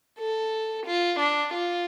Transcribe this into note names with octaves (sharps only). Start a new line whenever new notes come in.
A4
F4
D4
F4